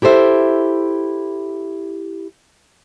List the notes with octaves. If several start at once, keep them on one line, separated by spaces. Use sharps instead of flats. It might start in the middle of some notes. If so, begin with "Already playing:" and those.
E4 G4 A4 C5 E5